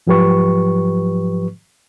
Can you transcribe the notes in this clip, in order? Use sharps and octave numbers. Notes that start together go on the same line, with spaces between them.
G#2 F3 F#3 G4 B4 C#6